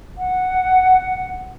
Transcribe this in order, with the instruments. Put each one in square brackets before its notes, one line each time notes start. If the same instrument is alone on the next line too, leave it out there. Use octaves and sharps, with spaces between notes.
[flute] F#5